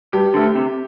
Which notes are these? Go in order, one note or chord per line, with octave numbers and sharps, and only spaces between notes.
G2 G4
D3 A3
C3